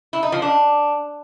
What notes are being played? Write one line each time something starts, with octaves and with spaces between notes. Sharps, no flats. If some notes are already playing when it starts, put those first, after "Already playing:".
E4
D#4
F3
D4